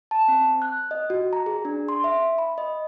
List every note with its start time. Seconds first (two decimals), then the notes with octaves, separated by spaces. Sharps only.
0.11 A5
0.28 C4
0.62 F#6
0.91 D#5
1.10 F#4
1.33 A#5
1.46 G#4
1.65 D4
1.89 C6
2.04 E5
2.38 B5
2.58 D#5